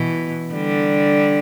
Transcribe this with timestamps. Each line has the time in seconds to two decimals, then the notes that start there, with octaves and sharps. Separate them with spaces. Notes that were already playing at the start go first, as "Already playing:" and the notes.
Already playing: B2 E3
0.53 D3 G3